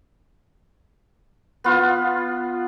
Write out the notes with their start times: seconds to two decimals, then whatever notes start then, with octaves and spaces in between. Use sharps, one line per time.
1.64 B3 F4